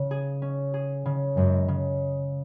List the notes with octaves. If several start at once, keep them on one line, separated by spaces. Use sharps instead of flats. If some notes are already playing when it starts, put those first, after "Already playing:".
Already playing: C#3
G#4
C#4
G#4
C#3
F#2 G#3
C#3